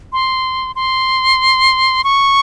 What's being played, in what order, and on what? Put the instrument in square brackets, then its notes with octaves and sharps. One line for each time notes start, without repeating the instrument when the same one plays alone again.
[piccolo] C6
C6
C#6